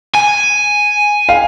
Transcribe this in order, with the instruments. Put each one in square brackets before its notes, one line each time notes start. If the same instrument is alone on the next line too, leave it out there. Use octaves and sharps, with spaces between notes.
[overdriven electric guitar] G#5
[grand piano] F5